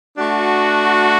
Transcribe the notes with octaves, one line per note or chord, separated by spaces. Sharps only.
A3 D4 F#4